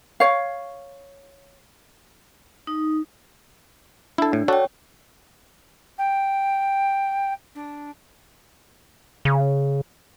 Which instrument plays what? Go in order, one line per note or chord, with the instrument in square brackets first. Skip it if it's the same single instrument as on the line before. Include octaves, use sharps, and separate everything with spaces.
[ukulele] C#5 F5
[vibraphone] D#4
[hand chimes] D4 [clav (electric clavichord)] E4 A4
[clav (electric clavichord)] A2
[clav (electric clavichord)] D4 F#4 A4 [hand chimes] C#5 G5
[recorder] G5
D4
[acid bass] C#3